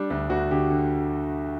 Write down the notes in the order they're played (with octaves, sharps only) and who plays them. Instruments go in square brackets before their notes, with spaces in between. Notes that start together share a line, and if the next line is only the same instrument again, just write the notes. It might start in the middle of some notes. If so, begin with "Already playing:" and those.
Already playing: [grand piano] G3 D4
D2 D4
D2 F#4
D3 G4
D3